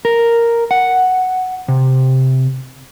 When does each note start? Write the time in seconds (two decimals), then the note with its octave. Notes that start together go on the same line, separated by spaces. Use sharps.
0.05 A#4
0.71 F#5
1.68 C3